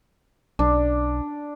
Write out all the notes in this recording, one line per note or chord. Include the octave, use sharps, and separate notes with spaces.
B1 D4